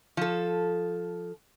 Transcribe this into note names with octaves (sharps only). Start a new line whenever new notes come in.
F3 A4